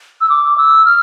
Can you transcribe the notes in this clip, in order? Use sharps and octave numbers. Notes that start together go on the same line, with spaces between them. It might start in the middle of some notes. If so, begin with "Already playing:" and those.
E6
D6
E6
F6